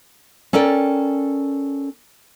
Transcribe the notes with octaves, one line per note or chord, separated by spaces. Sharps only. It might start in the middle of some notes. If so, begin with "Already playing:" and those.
C#4 A4 A#4 D5 G5